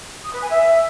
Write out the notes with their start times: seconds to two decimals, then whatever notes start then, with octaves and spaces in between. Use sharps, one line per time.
0.24 D#6
0.33 B4
0.42 G#5
0.51 E5